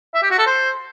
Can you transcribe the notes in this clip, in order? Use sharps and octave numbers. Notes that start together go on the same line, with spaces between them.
E5
G4
F#4
A4
C5